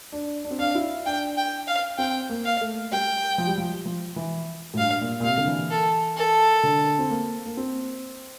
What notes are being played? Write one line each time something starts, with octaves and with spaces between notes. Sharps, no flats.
D4
D4
C4
D4 F5
E4
D4 G5
G5
F5
C4 G5
A#3
F5
A3
G3 G5
F3
G3
F3
F3
E3
A2
G2 F5
A#2
A#2
C3 F5
D3
E3
A4
A4
D3
C4
A#3
A#3
C4